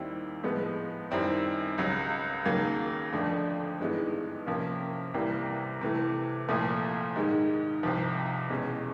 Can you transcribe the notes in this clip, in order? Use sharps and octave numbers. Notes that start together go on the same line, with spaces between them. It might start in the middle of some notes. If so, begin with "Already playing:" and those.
Already playing: D#2 D#3 G3 C4 E4
A2 F3 G#3 B3
F#2 D#3 G3 C4 E4
C#2 C#3 F#3
D#2 C#3 F#3 A#3
F2 D3 F3 A3 D4
G2 E3 G#3 B3 D#4
C3 F3 A#3 C#4
C2 C3 E3 G3 A#3
C3 E3 A3
C2 A#2 F3 A3
G#2 D#3 G#3
C2 C3 F3
E2 B2 G#3 C#4